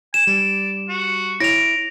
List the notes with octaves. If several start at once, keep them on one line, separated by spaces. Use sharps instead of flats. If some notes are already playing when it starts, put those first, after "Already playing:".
G#5 E7
G3 D5
F#4
E4 C#5 D6 A#6 F7